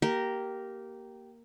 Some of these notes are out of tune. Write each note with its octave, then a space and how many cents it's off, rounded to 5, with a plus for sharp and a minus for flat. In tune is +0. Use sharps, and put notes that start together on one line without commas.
A#3 +0 G4 -15 A#4 +0